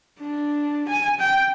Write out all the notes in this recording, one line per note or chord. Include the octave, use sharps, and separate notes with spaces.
D4
G#5
G5